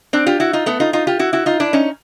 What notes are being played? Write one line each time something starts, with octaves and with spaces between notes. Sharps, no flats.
C4 D4
F4 G4
E4 F#4
D#4 F4
A3 B3
D#4 F4
D#4 F4
F4 G4
E4 F#4
E4 F#4
D#4 F4
D4 E4
C#4 D#4